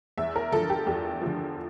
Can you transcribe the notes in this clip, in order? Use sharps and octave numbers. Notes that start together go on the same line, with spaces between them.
E2 E5
A#4
D3 F3 A4
G4
E2 G4
D3 F3